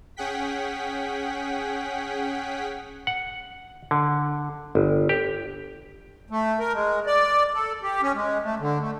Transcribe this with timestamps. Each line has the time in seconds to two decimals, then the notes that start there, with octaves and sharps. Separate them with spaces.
0.17 C#4 G#4 F#5 G5 B6
3.07 F#5
3.91 D3
4.75 G1
5.09 G4
6.30 A3
6.59 A#4
6.74 G#3
7.06 D5
7.55 A4
7.82 G4
8.02 C#4
8.15 G#3
8.43 A3
8.60 D3
8.80 A3